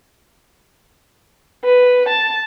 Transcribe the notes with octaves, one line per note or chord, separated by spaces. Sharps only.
B4
A5